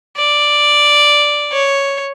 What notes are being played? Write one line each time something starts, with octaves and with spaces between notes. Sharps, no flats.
D5
C#5